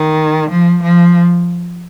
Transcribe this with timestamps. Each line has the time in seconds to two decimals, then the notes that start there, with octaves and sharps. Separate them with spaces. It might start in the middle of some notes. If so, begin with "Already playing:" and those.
Already playing: D#3
0.50 F3
0.83 F3